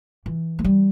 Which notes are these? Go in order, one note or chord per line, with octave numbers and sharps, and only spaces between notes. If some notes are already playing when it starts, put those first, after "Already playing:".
E3
A3
G3